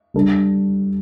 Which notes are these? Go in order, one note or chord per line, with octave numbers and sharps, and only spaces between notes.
G3 D4 A4